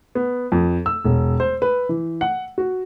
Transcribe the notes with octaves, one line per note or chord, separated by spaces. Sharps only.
B3
F2
E6
E1
C5
B4
E3
F#5
F#4